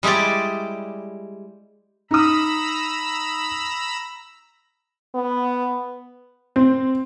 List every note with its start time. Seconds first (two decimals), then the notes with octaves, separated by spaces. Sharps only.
0.03 G3 G#3 E4 G4 D5
2.11 D#4 A#5 B5 D#6 E6
5.15 B3
6.56 C4